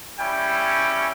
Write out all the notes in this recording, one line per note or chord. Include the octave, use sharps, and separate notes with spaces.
G3 C#4 E4 G5